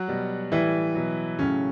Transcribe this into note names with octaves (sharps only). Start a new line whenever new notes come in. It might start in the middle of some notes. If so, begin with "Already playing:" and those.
Already playing: F#3 F#4
B2 G3
A2 E3 G3 E4
B2 F#3
A2 C#3 F#3 C#4